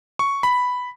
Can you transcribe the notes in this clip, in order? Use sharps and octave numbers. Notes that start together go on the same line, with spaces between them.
C#6
B5